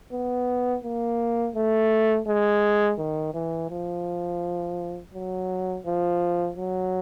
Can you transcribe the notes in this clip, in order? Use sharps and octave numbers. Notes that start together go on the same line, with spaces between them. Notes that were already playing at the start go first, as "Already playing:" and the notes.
B3
A#3
A3
G#3
D#3
E3
F3
F#3
F3
F#3